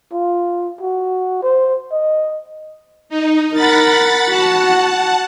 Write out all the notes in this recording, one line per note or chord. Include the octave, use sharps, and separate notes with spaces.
F4
F#4
C5
D#5
D#4
A#4 F#5 B5 A6
F#4 F#5 A5